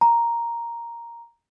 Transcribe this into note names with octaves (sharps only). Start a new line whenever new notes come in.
A#5